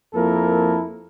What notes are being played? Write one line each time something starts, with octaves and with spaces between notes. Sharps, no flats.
F2 F3 A#3 E4 A4 A#4